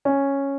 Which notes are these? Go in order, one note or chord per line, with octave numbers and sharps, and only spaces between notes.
C#4